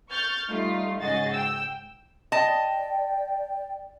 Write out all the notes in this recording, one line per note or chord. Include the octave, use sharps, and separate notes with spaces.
C#6 F6 G6 A6
G3 A3 D#4 F4
G#2 C#3 F#4 G#4 D#5 A6
G5 E6
D5 D#5 G5 A5